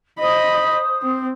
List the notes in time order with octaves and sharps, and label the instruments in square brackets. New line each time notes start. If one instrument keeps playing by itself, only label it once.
[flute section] C5 D#6 [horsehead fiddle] D#5 B5
[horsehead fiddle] C4